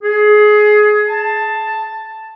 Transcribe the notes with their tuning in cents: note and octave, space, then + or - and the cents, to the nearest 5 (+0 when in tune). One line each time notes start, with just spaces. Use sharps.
G#4 +20
A5 +5